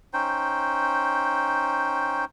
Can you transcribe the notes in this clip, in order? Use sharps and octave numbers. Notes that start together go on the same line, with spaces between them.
C#4 D#4 C5 G5